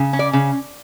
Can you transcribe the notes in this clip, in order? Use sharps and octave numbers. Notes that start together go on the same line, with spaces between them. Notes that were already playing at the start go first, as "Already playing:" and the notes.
Already playing: C#3
C#4
D5
C#3